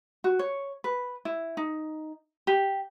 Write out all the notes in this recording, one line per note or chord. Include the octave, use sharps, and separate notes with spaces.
F#4
C#5
B4
E4
D#4
G4